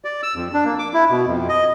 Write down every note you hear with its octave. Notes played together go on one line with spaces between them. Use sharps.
D5
E6
F2
D4
A#3
D6
E4
B2
F2
D#5